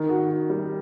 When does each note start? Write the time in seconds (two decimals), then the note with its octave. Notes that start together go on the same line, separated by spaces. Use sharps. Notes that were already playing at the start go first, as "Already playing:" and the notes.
Already playing: D#3
0.09 F#4
0.29 F#4
0.50 G3